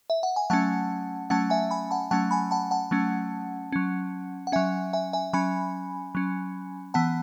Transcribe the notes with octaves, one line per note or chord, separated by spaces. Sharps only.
E5
F#5
G#5
F#3 A3 C#4 F#5 A5
F#3 A3 C#4 F#5 A5
E5 G#5
G#5 B5
F#5 A5
F#3 A3 C#4 F#5 A5
G#5 B5
F#5 A5
F#5 A5
F#3 A3 C#4
F#3 C#4
F#5
F#3 C#4 E5 G#5
E5 G#5
E5 G#5
F#3 C#4 G#5 B5
F#3 C#4
E3 B3 F#5 A5